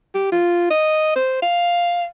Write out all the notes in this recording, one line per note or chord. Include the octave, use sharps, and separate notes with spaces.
G4
F4
D#5
C5
F5